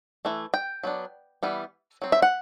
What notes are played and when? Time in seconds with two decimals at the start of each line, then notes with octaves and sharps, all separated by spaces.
0.25 E3 A3
0.54 G5
0.83 F#3 B3 D4
1.43 E3 G3 B3
2.02 F#3 C4
2.12 E5
2.22 F#5